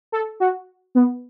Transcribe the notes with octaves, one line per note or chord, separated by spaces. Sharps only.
A4
F#4
B3